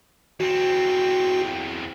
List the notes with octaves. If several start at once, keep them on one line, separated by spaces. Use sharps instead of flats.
E2 C4 F#4